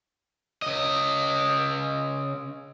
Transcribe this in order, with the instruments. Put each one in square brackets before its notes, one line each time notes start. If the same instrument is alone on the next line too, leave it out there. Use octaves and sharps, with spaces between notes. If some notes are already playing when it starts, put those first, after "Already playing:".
[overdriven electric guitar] C#3 D#5